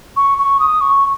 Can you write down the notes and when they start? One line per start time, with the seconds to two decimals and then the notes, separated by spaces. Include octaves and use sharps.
0.17 C#6
0.38 C#6
0.60 D#6
0.81 C#6